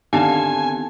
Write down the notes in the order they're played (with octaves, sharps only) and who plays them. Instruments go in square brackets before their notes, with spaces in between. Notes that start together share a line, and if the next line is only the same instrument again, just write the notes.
[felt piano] D3 D#3 [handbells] B3 C4 G4 [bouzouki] A4 F5 [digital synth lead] G#5